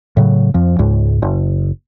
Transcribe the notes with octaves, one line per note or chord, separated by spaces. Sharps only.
A2 C#3 F#3
F2 F3
C#2 G#2
F#1